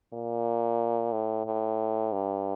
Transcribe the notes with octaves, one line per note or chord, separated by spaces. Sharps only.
A#2
A2
A2
G2